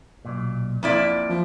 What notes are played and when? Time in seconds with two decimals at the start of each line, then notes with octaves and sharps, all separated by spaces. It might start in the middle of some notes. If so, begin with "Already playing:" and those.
0.25 B1 G2 A#2
0.83 F2 A#3 E4 D5 E5
1.29 F3